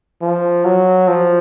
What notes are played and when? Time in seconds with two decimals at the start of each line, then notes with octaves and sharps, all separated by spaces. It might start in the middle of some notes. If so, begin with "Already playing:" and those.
0.22 F3
0.65 F#3
1.08 F3